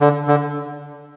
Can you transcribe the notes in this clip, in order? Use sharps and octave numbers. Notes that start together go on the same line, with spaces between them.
D3
D3